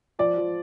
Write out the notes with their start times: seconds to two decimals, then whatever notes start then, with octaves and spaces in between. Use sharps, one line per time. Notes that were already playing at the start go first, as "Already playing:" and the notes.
0.19 F3 D5
0.38 F3